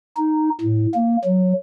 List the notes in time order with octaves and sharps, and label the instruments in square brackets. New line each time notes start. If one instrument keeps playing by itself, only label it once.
[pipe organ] D#4
A2
A#3
F#3